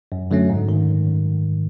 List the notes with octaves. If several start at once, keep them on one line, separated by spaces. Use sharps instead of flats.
F#2
D3 F#3 A3 C#4
G#2
D#3